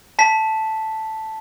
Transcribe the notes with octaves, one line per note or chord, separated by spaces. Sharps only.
A5 B6